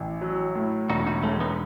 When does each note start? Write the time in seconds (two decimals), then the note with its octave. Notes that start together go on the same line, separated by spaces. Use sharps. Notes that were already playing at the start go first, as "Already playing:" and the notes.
Already playing: A1
0.21 F#3
0.55 A2
0.89 E1 D#4 F#4
1.06 D#4 F#4
1.23 G#3 A3 C#4
1.40 B3 D#4